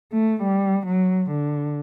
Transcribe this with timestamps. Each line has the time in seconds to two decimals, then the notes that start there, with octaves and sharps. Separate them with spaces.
0.13 A3
0.42 G3
0.86 F#3
1.30 D3